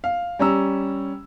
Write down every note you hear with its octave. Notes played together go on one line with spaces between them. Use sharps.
F5
G3 C#4 A#5 E6